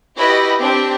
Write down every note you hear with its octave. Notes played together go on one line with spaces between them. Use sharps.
E4 F#4 G4 B4 D#5
C4 D4 G4